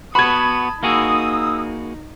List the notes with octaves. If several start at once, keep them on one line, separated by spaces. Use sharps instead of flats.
B3 F#4 A5 B5 D#6 G#6
A#3 D#4 F#4 G#4 D#6 E6